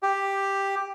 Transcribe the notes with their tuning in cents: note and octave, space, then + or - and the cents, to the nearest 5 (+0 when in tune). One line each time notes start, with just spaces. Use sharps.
G4 +5